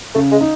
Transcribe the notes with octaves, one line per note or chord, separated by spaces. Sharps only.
C#3 A3
G#3
D#4